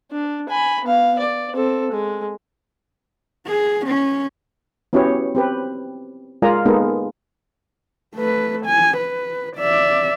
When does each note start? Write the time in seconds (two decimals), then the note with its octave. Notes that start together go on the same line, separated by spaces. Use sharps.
0.12 D4
0.49 G#5 B5
0.84 B3 F5
1.19 D5
1.55 C4 A4
1.91 G#3
3.47 G#4
3.86 C#4
4.93 B3 C#4 E4 F#4 G4 C#5
5.35 C4 G4 B4
6.42 G#3 F4 A#4 D5 G#5 A#5
6.66 G#3 A#3 B3 D#4 G#4 A4
8.16 A3 B4
8.66 G#5
8.97 B4
9.56 D5 E5